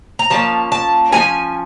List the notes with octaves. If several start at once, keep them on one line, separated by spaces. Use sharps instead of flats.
A#5
F3 A#3 C#4 A5
A5
F3 A#3 C#4 G#5